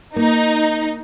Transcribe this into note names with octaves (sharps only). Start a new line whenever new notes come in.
A#3 D#4